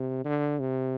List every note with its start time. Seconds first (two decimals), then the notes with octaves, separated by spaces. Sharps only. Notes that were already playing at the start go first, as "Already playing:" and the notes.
Already playing: C3
0.25 D3
0.60 C3